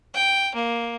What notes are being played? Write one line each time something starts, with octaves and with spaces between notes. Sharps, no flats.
G5
A#3